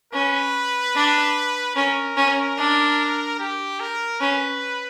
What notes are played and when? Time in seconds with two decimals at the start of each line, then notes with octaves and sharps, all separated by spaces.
0.13 C#4 B4
0.95 D4
1.75 C#4 A#4
2.17 C#4
2.57 D4
3.39 G4
3.80 A#4
4.20 C#4 B4